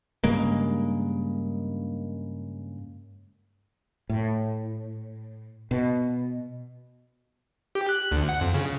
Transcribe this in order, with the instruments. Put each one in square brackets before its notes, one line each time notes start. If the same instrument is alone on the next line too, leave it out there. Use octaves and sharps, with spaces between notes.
[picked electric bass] G2 C#3 G#3 A#3
[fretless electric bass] A2
B2
[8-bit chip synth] G4
F#6
D2
F#5
F2
C#3